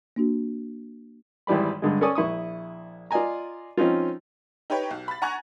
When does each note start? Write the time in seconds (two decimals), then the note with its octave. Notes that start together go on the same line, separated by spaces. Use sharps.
0.16 A#3 D4 F#4
1.47 G#1 E3 G3 D5 B5
1.82 G2 D3 G#3
2.01 C#4 A4 D5 G#5 C#6 D#6
2.15 A#1 E4 C#6 D#6
3.11 F4 D5 D#5 G#5 A#5
3.77 F3 C4 C#4 D#4 F4
4.70 D#4 G4 B4 C#5 G5
4.90 B1
5.08 B5 A6
5.22 F#5 G#5 A#5 C#6 F#6 G#6